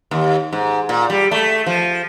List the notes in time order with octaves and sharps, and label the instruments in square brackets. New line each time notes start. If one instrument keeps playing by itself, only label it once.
[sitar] D#2
G#2
A#2
G3
A3
F3